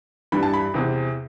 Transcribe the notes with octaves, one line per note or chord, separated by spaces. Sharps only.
G2 E3 G3 B5
A5
B5
E2 C3 E3